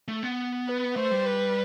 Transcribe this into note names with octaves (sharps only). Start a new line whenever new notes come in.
A3
B3
B4
A3 C5
G3
B4